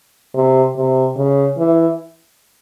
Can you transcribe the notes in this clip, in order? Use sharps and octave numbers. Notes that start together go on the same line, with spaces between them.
C3
C3
C#3
E3